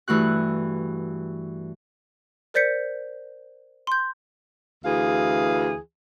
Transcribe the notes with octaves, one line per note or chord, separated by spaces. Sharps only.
G2 E3 A3 F#4 F#6
A#4 C5 D5 G6 B6 C#7
C6 G6
D2 E3 G#4 F5